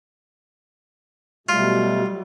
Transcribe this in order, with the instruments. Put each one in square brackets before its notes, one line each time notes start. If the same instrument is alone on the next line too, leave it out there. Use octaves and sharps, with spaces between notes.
[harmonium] B2 A3 [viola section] F#3 G3 [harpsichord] F4